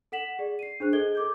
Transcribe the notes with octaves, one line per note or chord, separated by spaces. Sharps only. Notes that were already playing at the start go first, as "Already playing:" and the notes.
A4 F#5 B6 E7 F#7
G#4 D5
C7 D#7
D4 G#4 C5 F#6
G#4 A4 D#5 G#6 G7
A4 D6 G6